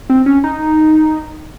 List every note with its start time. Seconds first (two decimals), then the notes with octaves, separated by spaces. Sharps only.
0.10 C4
0.26 C#4
0.44 D#4